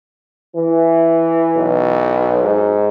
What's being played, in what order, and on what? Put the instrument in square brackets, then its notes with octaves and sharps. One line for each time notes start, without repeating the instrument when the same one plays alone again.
[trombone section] E3
[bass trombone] B1
G#2